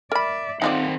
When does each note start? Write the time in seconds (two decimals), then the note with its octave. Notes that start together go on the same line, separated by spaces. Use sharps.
0.12 A#4 D5 E5 B5
0.62 D#3 C4 D#4 F4 D5 F#5